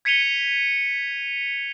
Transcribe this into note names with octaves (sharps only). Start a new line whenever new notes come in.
G#6 B6 C#7 D#7 F7 G7